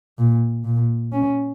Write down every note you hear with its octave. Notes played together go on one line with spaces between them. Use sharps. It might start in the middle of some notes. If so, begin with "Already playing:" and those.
A#2
A#2
C#4